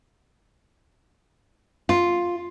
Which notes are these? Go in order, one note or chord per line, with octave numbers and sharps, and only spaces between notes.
F4